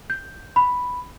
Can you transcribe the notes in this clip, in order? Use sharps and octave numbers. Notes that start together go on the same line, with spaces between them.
G6
B5